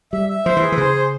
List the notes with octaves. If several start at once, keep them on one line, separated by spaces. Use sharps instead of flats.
G3 E5
E5
F3 C5
E3
G#4
E3
C#3 C5
C5